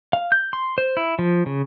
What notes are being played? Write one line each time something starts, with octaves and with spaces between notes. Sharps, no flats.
F5
G6
C6
C5
E4
F3
C#3